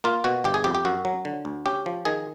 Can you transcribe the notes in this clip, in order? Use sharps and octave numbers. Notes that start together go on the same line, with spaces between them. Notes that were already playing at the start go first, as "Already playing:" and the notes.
A#3 F4
B2 F#4
G1 G4
G#4
F2 G4
G4
F#2 F#4
F#3
D3
D2
C#4 G4
F3
D#3 G#4